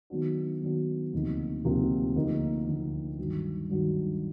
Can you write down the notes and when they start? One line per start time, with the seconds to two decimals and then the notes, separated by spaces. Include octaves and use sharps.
0.10 D#3 F#3 B3 D4 F#4
0.61 D#3 F#3 B3 D4 F#4
1.13 D2 C3 F3 A#3 D#4
1.64 D2 C3 F3 A#3 D#4
2.15 D2 D3 F3 A#3 D#4
2.66 D2 D3 F3 A#3 D#4
3.18 G2 D#3 F#3
3.69 G2 D#3 F#3